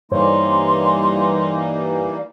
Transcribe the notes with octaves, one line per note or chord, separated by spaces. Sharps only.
G2 E3 G3 A#3 D#4 C5 C#5 C6